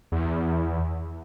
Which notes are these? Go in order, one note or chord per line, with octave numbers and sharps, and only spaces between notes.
E2